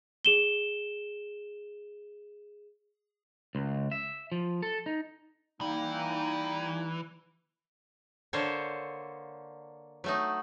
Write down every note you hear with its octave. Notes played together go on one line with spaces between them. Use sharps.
G#4 E7 G7
C#2
E5
F3
A4
D#4
E3 G3 A#3 D#4
D3 A#3 A4 C5 C#5
F#3 A3 D#4